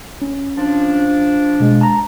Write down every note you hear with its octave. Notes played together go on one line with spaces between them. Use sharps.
C#4
F3 D4
B2 G#3
A5 A#5